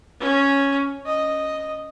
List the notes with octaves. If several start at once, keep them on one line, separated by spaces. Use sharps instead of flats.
C#4
D#5